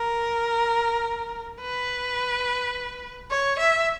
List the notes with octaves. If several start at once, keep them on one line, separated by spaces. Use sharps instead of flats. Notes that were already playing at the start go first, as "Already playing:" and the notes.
Already playing: A#4
B4
C#5
E5